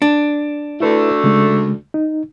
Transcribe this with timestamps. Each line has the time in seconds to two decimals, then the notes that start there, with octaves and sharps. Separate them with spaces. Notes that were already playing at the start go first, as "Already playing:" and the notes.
0.02 D4
0.80 D2 D3 A3 E4 B4
1.24 C#3 G#3
1.94 D#4